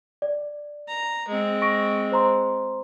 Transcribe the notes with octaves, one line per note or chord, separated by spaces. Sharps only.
D5
A#5
G#3 C4
C#6 A#6 D7
C5 A#5 C6